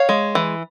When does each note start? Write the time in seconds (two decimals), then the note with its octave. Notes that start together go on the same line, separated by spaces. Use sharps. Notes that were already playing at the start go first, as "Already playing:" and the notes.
Already playing: C#5 F5
0.09 G#3
0.35 E3